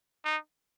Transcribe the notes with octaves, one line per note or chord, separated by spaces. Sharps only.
D#4